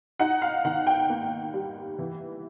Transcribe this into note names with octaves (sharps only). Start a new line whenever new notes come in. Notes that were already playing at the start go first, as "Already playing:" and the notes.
D#4 F#5
F5
D#3 F#5
G5
A#3
G3
E3